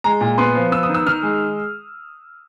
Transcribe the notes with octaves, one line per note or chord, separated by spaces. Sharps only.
G#3 A#5
A#2
B3 C6
F3
B3 E6
D#6
D#3
E6
D#3 F6
G#3